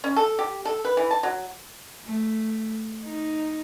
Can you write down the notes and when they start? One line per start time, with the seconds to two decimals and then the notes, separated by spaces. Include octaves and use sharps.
0.04 C#4
0.16 A4
0.39 G4
0.65 A4
0.85 B4
0.97 E3
1.11 A5
1.23 F#3
2.05 A3
3.05 D#4